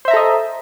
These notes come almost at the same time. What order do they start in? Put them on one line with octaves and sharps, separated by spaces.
C5 E5 A#5 A4 D#5